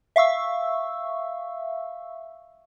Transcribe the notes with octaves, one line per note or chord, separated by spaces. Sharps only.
E5 F5 C#6 E6